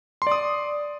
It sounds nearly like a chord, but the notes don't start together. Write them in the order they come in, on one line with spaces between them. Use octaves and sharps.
C6 D5 D#6